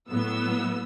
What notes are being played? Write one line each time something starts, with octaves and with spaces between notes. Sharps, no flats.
A2 F#3 B3 E6